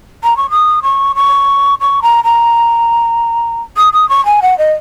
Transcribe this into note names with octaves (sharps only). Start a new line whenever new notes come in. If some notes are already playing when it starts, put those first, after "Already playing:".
A#5
C#6
D#6
C#6
C#6
C#6
A#5
A#5
D#6
D#6
C#6
G#5
F#5
D#5